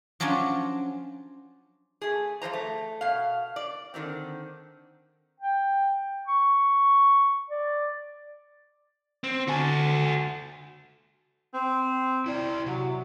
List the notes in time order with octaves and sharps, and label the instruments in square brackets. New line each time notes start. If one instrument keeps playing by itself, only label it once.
[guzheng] F3 F#3 C#4 D4 F4
[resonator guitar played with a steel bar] A3 G#4
F3 G3 C5 A#5
A3
B2 F5
D5
D3 D#3 G3 C4
[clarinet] G5
C#6
D5
[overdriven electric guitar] C4
[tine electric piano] D3 G#5 [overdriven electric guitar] F#4 A4
[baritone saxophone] C4
[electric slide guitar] E4 D5 G5
[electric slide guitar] C3 [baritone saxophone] F#3